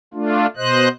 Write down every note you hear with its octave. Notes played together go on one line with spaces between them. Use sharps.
A3 D4 F4
B2 C5 D#5 F#6